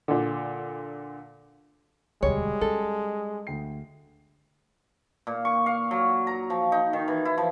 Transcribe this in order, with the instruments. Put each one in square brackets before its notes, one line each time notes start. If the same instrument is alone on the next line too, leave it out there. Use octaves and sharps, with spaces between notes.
[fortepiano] A#2 D3
[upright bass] E1 D2 [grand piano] G3 [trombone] G#3 [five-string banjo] C#5
[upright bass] C#4 [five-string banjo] A4
[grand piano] D2 G5 C7
[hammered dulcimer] A#2
C#6
F5
F#3
A#5
F3
D#4
D#3
E3
E4
F3